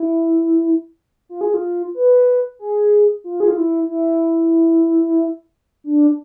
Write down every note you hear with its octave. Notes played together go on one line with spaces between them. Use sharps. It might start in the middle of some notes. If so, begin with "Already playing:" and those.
Already playing: E4
F4
G#4
F4
B4
G#4
F4
G#4
F4
E4
E4
D4